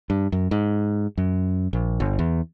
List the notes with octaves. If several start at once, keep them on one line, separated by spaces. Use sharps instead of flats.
G2
F#2
G#2
F#2
A#1
G1
E2